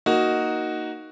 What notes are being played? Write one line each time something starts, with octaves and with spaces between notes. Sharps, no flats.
A#3 D#4 F#4